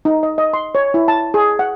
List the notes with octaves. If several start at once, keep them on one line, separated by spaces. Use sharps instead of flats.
D#4
D#5
D#5
C6
C#5
E4
A5
G#4
F#5